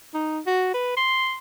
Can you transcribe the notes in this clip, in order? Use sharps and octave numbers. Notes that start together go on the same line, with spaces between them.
D#4
F#4
B4
C6